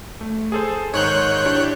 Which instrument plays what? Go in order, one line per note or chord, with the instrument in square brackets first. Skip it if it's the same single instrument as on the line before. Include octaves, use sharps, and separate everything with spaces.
[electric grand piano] A3
G#4 A4 C5
[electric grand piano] G#2 D#3 [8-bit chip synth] C#5 F#6 G6
[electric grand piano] D4 E4 G4